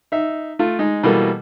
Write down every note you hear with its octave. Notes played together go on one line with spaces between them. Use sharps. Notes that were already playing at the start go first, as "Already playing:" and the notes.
D#4 E5
A3 F4
G#3 D#4
B2 E3 G3 A#3 A4